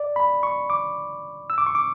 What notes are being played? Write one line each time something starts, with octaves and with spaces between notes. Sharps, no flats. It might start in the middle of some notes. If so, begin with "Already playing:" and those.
Already playing: D5
B5
C#6
D6
E6
D6
C#6
D6